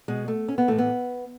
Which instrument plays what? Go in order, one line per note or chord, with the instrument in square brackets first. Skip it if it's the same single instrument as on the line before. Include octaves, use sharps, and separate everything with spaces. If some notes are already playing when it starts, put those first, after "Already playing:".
[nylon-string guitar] B2 G#3
A3
C#4
B3
A2 E3 A3
B3